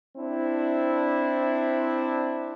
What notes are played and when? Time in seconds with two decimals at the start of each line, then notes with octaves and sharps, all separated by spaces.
0.17 C4 D4 E4